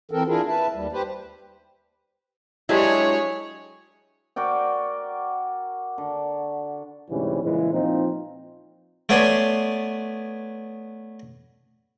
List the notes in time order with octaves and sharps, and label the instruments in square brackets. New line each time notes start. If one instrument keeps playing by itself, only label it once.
[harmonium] E3 C4 A4 A#4
D4 E4 F4 G#4 A#4
B4 E5 A5
D#2 G3
G4 B4 C5
[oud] F#3 G#3 D4 [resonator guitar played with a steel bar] E4 G4 C5 [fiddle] G#4 C#5
[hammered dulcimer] F#4 A#4 D5 G5
D3
[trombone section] D2 G#2 C3 E3 G3 C#4
A#2 C#3 E3 G#3 E4
A#2 F3 C4 D#4 F4 C5
[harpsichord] A3 B3 C#5 D5 G#5 C6